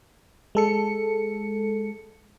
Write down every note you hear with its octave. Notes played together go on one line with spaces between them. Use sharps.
G#3 A4 C#7